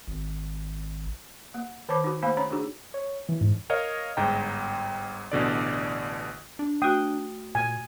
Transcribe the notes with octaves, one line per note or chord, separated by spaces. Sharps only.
G#1
A#3
D#3 C5 C#5 A5 B5 D6
D#4 F#4
A3 A#3 C5 F5 G#5 B5
C#4 C#5 A#5 B5
D4 D#4 F#4 G#4
C#5
E3
G#2
A#4 C#5 D#5 F5
G1 G#2 G5 A#5
A1 B2 D3 D5
D4
A3 F#4 G5 D#6
A#2 G#5